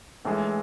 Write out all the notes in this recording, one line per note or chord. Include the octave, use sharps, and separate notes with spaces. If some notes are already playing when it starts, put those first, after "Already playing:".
A#1 A2 E3 G#3